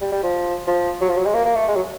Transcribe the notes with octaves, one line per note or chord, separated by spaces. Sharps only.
G3
G3
F3
F3
F#3
F3
F#3
G#3
A#3
A#3
A3
G#3
F#3